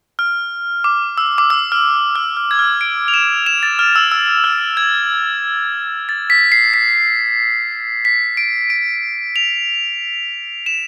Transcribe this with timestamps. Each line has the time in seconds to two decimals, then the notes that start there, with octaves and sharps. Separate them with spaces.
0.19 F6
0.84 D6
1.18 E6
1.38 D6
1.50 E6
1.72 F6
2.16 F6
2.37 F6
2.51 G#6
2.59 F6
2.81 D7
3.08 F7
3.14 E7
3.46 E7
3.63 A6
3.79 F6
3.96 E6
4.12 E6
4.44 F6
4.77 G#6
6.09 A6
6.30 B6
6.52 C7
6.74 B6
8.05 B6
8.37 D7
8.70 D7
9.36 F7
10.66 E7